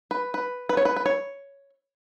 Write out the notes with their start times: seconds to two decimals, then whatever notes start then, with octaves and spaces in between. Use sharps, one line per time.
0.11 B4
0.34 B4
0.69 B4
0.77 C#5
0.85 B4
0.96 B4
1.06 C#5